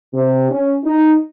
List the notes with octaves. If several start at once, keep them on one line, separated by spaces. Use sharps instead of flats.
C3
C#4
D#4